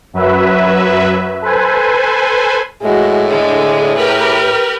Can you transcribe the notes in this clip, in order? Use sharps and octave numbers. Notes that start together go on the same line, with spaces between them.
F#2 F#3 B4 E5
A4 B4 C5 G#5
A2 G#3 F#4
D3 G#3 G#4
G4 A#4 B4